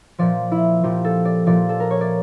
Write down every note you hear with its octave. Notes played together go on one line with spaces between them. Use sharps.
A#2 F3 D5
E4
A#2 F3 G4
A4
D5
A#2 F3 D5
A4
A#4
C#5
D5